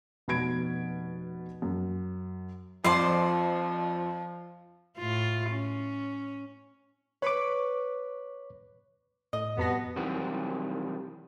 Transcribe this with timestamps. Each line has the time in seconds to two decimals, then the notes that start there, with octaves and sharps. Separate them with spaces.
0.28 F1 B2 B5 G#6 D7
1.62 F#2
2.85 F2 F3 C5 D5 C6
4.98 A2 F4
5.50 C#4
7.22 B4 C#5 C#6 D6
9.33 A2 D#5
9.58 F2 B2 G3 B3 A5 A#6
9.96 C3 D#3 E3 F#3 G3 F#4